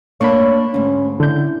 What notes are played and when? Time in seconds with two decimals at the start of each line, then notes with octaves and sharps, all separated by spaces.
0.21 A#3 D4 C#5 B5 C#6
0.74 D2 G#2 C#4
1.20 D3 E4 G6